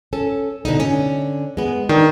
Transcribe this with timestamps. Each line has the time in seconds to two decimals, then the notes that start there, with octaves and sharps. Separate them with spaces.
0.13 C#4 A4
0.65 B2 D3 D#4
0.80 D3 C#4
1.57 G#3 B3
1.89 D#3 D4